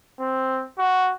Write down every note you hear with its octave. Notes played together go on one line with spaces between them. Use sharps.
C4
F#4